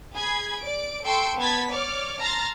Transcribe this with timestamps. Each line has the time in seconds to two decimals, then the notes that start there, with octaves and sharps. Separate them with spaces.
0.15 G#4 B5 G#6 C7
0.60 D5 D7
1.05 A4 G5 C6 C#6 E6 D7
1.38 B3 A5 B5 G#6 A6 B6
1.70 C#5 D5 D6 F6
2.20 A5 A#5 C6 F6 A6 A#6